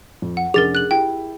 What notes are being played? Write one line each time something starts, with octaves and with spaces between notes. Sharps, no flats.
F2
F#5
F1 C#4 D4 G#4 A#4 A6 F7
F#6 F#7
E4 G4 G5